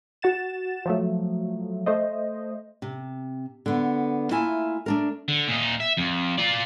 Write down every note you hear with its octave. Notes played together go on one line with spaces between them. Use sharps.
F#4 F#5 A6 E7
F3 F#3 A3
A3 C5 D#5
C3
D3 B3
A3 A#3 E4 F4 E5 G#5
A3 D4 A#4
D3
A#2 D#4
E5
F2
F4 D5